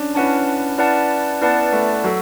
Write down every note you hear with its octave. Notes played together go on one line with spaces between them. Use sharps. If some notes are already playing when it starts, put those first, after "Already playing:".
Already playing: C#4 D4
C#4 E4 B4 F#5 A5
E4 B4 D5 F#5 A5
B3 E4 B4 D5 F#5 A5
A3
F#3 F#4 A4